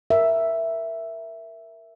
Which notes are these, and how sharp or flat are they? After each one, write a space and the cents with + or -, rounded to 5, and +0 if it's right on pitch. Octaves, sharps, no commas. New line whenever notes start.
A#4 +0 E5 +0